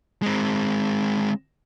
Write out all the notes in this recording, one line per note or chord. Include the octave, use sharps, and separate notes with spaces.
G#3 C4